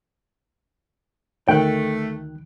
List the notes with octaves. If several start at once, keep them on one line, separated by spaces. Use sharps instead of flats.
D2 D#3 A3 G5 F#6